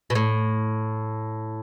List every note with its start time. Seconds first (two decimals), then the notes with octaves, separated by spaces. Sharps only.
0.10 B2
0.15 A2